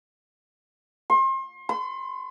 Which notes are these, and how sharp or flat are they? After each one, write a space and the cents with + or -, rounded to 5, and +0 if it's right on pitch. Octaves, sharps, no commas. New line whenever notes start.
C6 +35
C6 -45